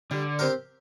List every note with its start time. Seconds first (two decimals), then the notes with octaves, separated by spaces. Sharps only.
0.11 D3 G3
0.39 C4 G4 A#4